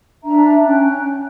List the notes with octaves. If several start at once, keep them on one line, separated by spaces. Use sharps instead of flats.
D4 E5 A#5
C#4 G5 F#6